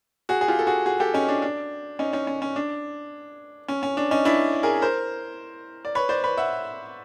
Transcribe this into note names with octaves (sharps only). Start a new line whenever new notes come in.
F#4 G#4
G#4
F4 G4
A4
F#4 G#4
F#4 G#4
G4 A4
C#4 D#4
D4
D4
C#4 D#4
C#4 D#4
C#4
C#4
D4
C#4
C#4
D4
C#4 D#4
D4 E4
G#4 A#4
A#4 C5
D5
B4 C#5
C5 D5
B4 C#5
E5 F#5